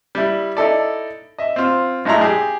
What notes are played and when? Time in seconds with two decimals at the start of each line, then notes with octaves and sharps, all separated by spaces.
0.15 G3 E4
0.57 D#4 E4 A4 D5
1.39 D#5 E5
1.56 C4 F4
2.05 B1 A2 G#3 D#4 E4 A#5
2.21 G4 G#4